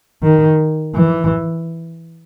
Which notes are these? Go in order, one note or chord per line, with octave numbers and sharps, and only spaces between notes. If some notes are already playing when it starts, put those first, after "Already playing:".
D#3
E3